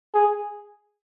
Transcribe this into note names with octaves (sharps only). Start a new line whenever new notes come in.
G#4